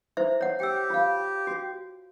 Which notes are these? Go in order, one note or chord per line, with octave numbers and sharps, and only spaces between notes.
E4 C5 E5
C#5 F#5
G4 G5 E6
F4 F5
F#4